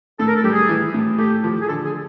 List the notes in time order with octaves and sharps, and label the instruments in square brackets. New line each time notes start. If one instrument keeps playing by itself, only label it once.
[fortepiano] A2 [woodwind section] A4
[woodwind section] A#4
A4
[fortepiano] G3 [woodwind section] G4
[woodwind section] G#4
[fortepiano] E3
A2
[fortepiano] A3 [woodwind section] G4
[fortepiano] F3
[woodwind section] G#4
[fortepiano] D3 [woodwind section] A4
[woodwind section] G#4